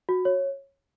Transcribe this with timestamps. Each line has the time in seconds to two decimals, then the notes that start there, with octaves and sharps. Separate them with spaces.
0.09 F#4
0.25 C#5